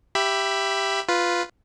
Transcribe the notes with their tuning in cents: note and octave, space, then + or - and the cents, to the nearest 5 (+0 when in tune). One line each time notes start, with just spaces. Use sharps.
G4 +0 E5 +15 B5 +0
F4 +0 B4 +0